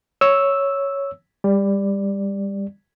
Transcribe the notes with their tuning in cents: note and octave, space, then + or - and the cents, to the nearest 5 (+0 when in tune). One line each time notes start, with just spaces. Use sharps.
C#5 +0 E6 -5
G3 +25 D5 +0